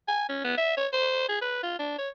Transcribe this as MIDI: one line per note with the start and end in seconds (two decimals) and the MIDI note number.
0.08 0.25 80
0.29 0.41 61
0.44 0.55 59
0.57 0.74 76
0.77 0.88 73
0.93 1.28 72
1.29 1.38 68
1.42 1.60 71
1.63 1.76 65
1.79 1.98 62
1.98 2.09 73